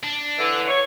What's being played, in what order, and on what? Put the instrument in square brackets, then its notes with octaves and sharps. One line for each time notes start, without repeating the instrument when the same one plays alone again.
[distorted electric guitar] D4
[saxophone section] D3 E3
C#5